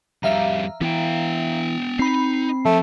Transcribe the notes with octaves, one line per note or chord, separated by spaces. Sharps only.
F2 G3 E5 F5 A#5
E3 B3 G5
C4 D#4 B5 C7
F3 A3